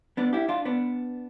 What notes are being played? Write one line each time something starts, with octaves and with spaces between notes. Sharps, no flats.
B3 D4
E4 G4
D4 F4
B3 D4